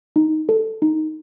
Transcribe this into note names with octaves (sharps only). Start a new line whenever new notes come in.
D#4
A4
D#4